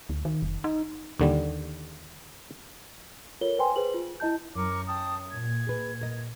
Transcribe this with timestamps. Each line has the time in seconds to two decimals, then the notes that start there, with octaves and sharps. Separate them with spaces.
0.09 D2
0.25 D#3
0.42 F1
0.64 D#4
1.20 D#2 D3 G3
3.41 F4 A4 A#4 C#5 G7
3.58 B4 C5 G5 G#5 C6
3.76 G#4 B4 C5 F#7
3.94 F4
4.20 E4 D#5 A5 G6
4.55 F#2 A#4 C#6 D6
4.88 G5 A5 D#6
5.31 A#2 G#6
5.67 G#4 B4
6.01 A#4 D#5